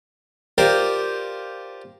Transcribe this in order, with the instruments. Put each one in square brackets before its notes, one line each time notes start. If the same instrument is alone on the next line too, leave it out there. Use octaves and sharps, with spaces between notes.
[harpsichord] F4 G4 A#4 C5 D5